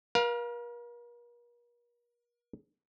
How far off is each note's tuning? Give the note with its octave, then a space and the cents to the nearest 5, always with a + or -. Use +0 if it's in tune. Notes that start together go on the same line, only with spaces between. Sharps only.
A#4 +45 F5 +10